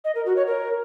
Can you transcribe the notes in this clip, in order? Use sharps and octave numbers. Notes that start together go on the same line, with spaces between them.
D#5
A#4
F#4
C#5
A#4